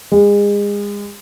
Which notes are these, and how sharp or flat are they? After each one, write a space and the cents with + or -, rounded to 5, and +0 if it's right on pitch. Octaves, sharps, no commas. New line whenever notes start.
G#3 -30